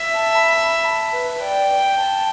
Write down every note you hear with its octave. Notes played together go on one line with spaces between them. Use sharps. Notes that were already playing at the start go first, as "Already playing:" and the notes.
Already playing: E5
A5
B5
B5
A5
B4
D5 G5
A5